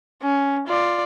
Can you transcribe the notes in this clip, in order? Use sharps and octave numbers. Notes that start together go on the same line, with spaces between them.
C#4
F4 D5